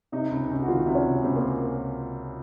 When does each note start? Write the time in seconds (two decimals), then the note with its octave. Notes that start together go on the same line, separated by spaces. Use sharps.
0.12 C3 D#4
0.31 C#2
0.50 C#2
0.62 F#4
0.68 D#3 F4
0.86 C3
0.95 C#4
1.04 C#2
1.23 C#2 C4
1.36 A#3